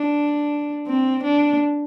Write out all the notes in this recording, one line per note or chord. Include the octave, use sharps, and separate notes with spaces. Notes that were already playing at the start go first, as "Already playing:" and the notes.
Already playing: D4
C4
D4